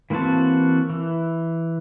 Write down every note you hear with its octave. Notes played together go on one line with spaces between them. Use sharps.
E3 A#3 C4 F#4 A5
E3